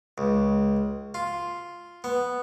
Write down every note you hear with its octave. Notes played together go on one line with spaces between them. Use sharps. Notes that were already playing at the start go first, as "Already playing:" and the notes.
C#2
F4
B3